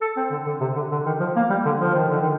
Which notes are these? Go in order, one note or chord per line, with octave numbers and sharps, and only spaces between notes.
A4
C4
D3
D3
C3
D3
D3
D#3
F3
A#3
G3
D3
F3
D#3
D3
D#3